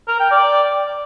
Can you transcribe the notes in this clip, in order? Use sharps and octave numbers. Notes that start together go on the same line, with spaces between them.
A#4
G5
D5